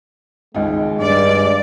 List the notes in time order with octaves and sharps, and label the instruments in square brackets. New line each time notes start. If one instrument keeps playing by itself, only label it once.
[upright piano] G#1 C#2 D#4 [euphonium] G#3
[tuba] G2 [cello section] D5